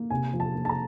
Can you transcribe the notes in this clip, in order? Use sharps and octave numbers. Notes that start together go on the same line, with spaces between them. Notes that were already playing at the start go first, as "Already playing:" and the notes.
Already playing: A#3
C3 G#5
F3
A5
A#3
A5
A#5